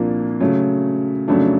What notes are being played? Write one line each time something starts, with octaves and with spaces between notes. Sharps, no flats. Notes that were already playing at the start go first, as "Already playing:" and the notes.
Already playing: C2 A#2 F3 A#3 D4
C#3 F#3 A3
F2 C#3 F#3 A3 D4